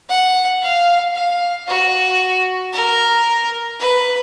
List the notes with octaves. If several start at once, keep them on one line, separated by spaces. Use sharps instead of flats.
F#5
F5
F5
F#4
A#4
B4